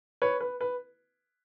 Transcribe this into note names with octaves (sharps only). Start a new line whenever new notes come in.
B4 C#5
B4
B4